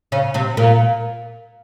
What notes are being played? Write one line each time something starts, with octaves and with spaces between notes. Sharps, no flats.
C#3 C#4
C3 C4
A#2 A#3